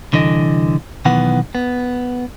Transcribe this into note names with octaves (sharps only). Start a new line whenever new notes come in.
C2 D3 E3 D#5
B1 D#3 E3 B3 F#5
B3